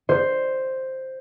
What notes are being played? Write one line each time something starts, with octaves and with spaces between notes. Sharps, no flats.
C5